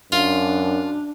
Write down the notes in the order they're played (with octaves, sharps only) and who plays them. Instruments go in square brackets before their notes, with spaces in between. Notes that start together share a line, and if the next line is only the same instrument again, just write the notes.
[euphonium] F#2 [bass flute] D4 [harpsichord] F4